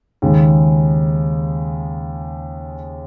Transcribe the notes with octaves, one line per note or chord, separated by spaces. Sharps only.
D#2 C#3 G#3